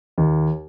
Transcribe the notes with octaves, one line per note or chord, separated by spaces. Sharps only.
D#2